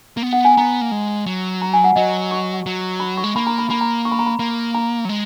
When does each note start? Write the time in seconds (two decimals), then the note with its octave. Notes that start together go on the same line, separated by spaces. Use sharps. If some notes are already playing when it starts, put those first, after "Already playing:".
0.17 A#3
0.22 B3
0.33 F#5
0.45 G#5
0.57 B3 A#5
0.81 A#3
0.91 G#3
1.26 F#3
1.62 A#5
1.73 G#5
1.84 F#5
1.96 F#3 D#5
2.31 C#6
2.66 F#3
3.00 B5
3.17 C#6
3.24 G#3
3.36 A#3 B5
3.47 A#5
3.58 B5
3.70 A#3 B5
3.81 A#5
4.05 C#6
4.12 B5
4.19 A#5
4.27 B5
4.39 A#3
4.75 A#5
5.05 F#3
5.09 G#3